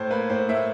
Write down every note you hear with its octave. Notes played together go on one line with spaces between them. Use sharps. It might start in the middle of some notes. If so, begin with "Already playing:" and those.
Already playing: A2 C5
A#3 B4
A2 C5
A2 E5